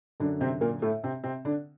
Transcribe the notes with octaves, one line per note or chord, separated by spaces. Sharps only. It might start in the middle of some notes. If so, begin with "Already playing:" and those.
F#2 D3 D4
C3 C4
A#2 A#3
A2 A3
C3 C4
C3 C4
D3 D4